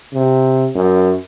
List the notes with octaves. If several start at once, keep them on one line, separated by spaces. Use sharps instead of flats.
C3
F#2